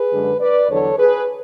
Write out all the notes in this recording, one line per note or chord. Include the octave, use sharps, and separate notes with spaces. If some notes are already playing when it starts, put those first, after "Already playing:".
Already playing: G#4 B4
F#2 D3 G#3
B4 D5
E2 D3 F#3 A4 C#5
G#4 B4